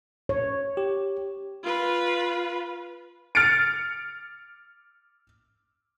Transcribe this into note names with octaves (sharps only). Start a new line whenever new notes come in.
C#5
G4
F4 B4
F6 A6 C#7 D7